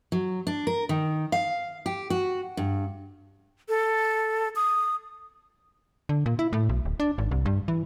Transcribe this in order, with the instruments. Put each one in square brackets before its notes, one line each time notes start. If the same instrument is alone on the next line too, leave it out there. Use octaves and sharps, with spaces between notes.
[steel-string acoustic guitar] F#3
D4
A#4
D#3
F5
G4
F#4
G2
[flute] A4
D#6
[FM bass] D3
A#2
E4
A2
B1
D1
D4
G#1
C2
G2
E3